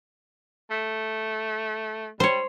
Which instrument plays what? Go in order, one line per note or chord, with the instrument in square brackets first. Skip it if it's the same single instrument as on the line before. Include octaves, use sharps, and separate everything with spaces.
[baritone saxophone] A3
[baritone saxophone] G3 [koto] C5 C#5